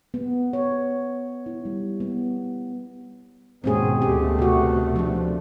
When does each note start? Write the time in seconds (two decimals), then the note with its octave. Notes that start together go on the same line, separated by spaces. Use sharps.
0.14 B3
0.53 C#5
1.46 E4
1.65 G3
2.00 B3
3.64 D#2 G#2 B2 C4 C#4 G#4
4.02 D2 B2 A3 G4
4.39 C3 F#4
4.96 F3 D4